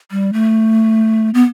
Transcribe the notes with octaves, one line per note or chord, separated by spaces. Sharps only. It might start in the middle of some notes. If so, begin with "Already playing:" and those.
G3
A3
B3